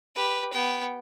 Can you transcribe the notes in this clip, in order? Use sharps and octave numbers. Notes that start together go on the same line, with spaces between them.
G4 B4
B3 G5